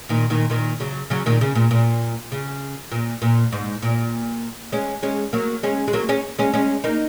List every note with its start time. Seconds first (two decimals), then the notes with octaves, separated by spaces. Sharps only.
0.09 A#2 D#3
0.30 A#2 D#3
0.50 A#2 D#3
0.80 C#3 F#3
1.10 C#3 F#3
1.26 A#2 D#3
1.41 C#3
1.55 A#2
1.71 A#2
2.32 C#3
2.92 A#2
3.22 A#2
3.52 G#2
3.82 A#2
4.72 G#3 C#4
5.03 G#3 C#4
5.33 F#3 A#3
5.63 G#3 C#4
5.88 G#3
5.93 F#3 A#3
6.09 G#3 C#4
6.38 G#3 C#4
6.54 G#3 C#4
6.84 A#3 D#4